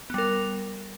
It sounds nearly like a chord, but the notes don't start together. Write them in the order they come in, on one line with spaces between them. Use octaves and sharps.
B3 G3 A#4